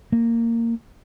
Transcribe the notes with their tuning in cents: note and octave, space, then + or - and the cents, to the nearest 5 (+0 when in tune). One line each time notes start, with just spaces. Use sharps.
A#3 -15